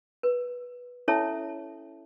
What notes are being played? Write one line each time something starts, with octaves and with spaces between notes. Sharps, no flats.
B4
C#4 E4 A4 C#5 E5 A5